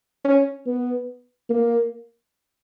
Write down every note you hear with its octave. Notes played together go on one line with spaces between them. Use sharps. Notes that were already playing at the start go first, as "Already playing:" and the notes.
C#4
B3
A#3